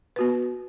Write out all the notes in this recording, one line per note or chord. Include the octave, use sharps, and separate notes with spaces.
B3 F#4 B4